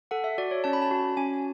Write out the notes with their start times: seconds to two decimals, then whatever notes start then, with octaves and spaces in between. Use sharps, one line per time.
0.11 A4 F#5
0.24 E5
0.38 F#4 D5
0.51 C#5
0.64 C#4 A5
0.73 B5
0.82 A5
0.91 F#4
1.17 C#4 G#5